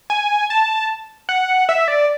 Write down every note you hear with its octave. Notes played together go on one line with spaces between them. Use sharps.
G#5
A5
F#5
E5
D5